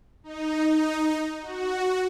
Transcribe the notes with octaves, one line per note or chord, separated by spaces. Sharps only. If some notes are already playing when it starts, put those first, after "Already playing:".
D#4
F#4